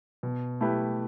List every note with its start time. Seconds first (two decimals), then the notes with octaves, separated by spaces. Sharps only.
0.23 B2
0.61 A3 E4 G4 B4